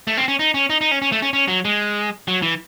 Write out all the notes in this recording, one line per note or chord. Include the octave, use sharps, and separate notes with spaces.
A3
C4
C#4
D#4
C#4
D#4
D#4
C#4
C#4
A3
C#4
C#4
F#3
G#3
F#3
E3